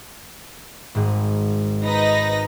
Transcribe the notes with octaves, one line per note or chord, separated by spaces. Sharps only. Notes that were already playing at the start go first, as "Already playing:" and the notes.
G#1 G#2 G#4
D#4 B4 A#6